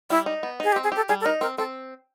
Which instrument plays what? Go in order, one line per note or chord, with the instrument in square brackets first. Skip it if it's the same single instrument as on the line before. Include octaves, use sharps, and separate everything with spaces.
[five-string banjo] G3 [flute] E4
[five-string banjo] D#4
B3
[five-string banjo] D#4 [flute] G#4
[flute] G4
[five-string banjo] C4
[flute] G#4
[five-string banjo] G4 [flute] A4
[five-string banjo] G3 [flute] G#4
[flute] A4
[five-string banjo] D#4 [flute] A#4
[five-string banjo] C4 [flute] A#4
[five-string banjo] C4 [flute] A4